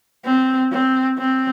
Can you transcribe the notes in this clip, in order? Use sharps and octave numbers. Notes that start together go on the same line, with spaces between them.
C4
C4
C4